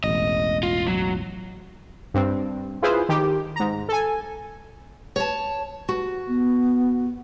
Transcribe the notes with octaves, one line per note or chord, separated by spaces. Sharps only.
E1 A1 D#5
F4
F#3
G2 C4
E4 F4 G#4 B4 C5
D#3 G4
G#2 A#5
A4 G#5
C#5 A5
F#4
B3